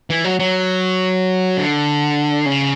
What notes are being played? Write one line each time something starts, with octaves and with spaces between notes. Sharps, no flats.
E3
F#3
F#3
D3
C#3